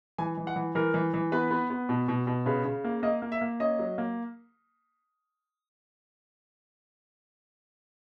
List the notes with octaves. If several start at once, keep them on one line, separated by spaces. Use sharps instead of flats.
E3 G#5
E3
F#5
E3
E3 A#4
E3
E3
B3 B4
B3
B3
B2
B2
B2
C#3 B4
C#3
A#3
A#3 D#5
A#3
E5
A#3
C#4 D#5
F#3
A#3